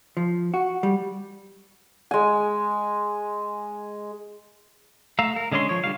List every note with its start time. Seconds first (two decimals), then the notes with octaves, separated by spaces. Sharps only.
0.17 F3
0.54 F#4
0.83 G3
2.11 G#3 G#5
5.19 A3 F5 A#5 E6
5.36 A#4
5.52 D3 G#3 C#4 C#5 C6
5.69 F3 C#5
5.84 D3 G3 F5